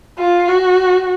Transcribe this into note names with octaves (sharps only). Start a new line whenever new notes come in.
F4
F#4